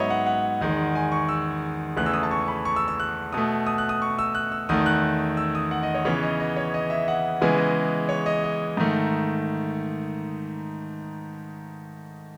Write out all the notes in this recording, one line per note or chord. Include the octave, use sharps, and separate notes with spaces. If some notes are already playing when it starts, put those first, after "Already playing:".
Already playing: G#2 F#3 B3 C#5 D#5 E5 B5
F#5
F#5
E2 D#3 G#3
G#5
C#6
E6
E2 C#3 E3 A3 F#6
E6
D#6
A5
C#6
B5
C#6
E6
E6
F#6
B2 A3 D#6
D#6
F#6
D#6
C#6
E6
F#6
E6
E2 D#3 A3 D#6
F#6
E6
D#6
F#5
D#5
C#5
C#3 E3 B3 C#5
D#5
D#5
C#5
D#5
E5
F#5
C#3 E3 G#3 B3 G#5
D#5
C#5
D#5
D#5
G#2 D#3 A3